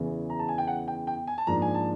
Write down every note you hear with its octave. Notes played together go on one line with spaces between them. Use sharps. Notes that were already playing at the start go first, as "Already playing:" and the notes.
Already playing: E2 C#3 E3
A#5
A5
G#5
G5
F#5
G5
G5
G#5
A5
G#2 F3 A#3 D4 A#5
G#5
A5